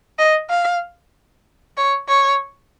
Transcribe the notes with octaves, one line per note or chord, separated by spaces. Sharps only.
D#5
F5
C#5
C#5